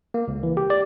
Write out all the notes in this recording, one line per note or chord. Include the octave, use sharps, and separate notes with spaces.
A#3
C#2
E3
G4
D5